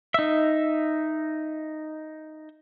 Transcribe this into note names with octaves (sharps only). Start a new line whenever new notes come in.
D#4 E5